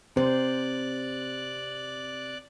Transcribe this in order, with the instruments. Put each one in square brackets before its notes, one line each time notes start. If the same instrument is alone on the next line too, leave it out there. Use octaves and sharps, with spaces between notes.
[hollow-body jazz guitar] C3 [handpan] C5 [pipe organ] D5 F#6